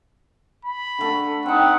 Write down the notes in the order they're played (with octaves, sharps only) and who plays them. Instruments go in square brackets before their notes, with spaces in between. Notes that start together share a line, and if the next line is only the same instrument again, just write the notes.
[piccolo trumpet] B5
[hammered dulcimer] D3 A3
[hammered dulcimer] C4 D#4 [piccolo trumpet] F#5